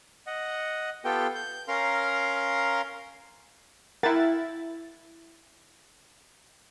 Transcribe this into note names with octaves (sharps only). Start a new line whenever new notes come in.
D#5 F#5
B3 F4 G4 A4 G5
G6
C#4 A#4 F5 A#5 C6
E4 A#4 F#5 G5 A6